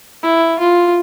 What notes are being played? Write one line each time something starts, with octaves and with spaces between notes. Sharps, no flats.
E4
F4